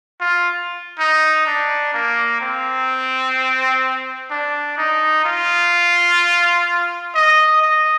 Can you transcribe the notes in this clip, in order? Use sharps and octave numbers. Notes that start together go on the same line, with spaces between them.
F4
D#4
D4
A#3
C4
D4
D#4
F4
D#5
D#5